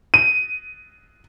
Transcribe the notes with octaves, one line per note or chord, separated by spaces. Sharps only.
D#7